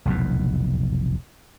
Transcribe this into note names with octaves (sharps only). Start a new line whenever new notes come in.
F1 B1 E2 A#2